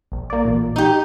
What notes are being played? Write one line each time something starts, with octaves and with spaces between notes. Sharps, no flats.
A#1
A#3 D5
A1 A#2
D#4 G4